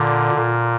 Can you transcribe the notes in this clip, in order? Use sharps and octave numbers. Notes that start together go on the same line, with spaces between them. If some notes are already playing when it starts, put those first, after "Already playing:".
Already playing: A#2 D3
A#2